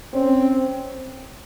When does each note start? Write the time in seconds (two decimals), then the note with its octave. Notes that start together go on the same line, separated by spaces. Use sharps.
0.13 C4 C#4